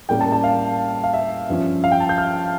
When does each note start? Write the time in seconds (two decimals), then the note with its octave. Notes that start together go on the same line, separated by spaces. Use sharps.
0.09 A2 G3 A#3 C#4 G5
0.21 A5
0.32 A5
0.44 F5
1.04 F5
1.13 E5
1.49 G2 F3 C#4
1.84 F5
1.92 G5
2.00 A5
2.09 G6
2.18 F6